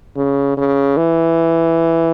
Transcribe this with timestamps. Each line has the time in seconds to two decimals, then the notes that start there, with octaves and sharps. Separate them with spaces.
0.17 C#3
0.57 C#3
0.97 E3